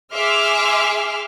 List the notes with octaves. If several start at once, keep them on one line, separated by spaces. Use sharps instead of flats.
G#4 E5 C6 D6 F6